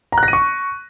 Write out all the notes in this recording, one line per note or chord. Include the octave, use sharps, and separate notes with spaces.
A#5
F#6
A#6
D#7
C#6